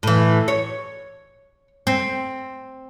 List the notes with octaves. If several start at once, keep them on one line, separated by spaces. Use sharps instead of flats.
A2 E3
C#5
C4